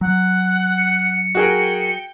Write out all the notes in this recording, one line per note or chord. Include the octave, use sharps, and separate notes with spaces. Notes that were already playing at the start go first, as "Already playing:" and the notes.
F#3 F#5
C#7
F#4 G#4 A#4 G5